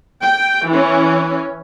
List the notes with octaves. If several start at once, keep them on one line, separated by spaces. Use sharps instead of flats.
G5
E3 C#4